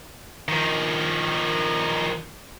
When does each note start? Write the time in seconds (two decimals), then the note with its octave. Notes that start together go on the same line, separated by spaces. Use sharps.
0.48 D#3 F3